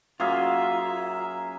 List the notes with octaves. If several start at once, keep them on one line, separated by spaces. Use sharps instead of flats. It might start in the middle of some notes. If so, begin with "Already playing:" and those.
F#2 A#3 F4 G#4 E5 A#5